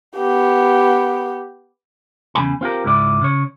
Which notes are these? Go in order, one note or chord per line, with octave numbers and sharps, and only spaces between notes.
B3 G4
E2 C#3 G#3 D#4 G#5 B5
C4 F4 G4 A#4
C#2 G#2 E4 D5
C#3 C#5